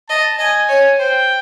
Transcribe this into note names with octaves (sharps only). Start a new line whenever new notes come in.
D#5 A5
D#5 G#5
C#5
C5 G5